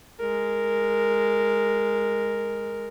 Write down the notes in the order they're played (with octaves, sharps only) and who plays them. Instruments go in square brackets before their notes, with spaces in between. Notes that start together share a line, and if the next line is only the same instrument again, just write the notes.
[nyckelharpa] G#3 A#4